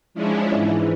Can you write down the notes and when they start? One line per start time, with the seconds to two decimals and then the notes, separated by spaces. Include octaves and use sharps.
0.14 F3 G#3 C#4 D4 E4
0.53 G#2 E3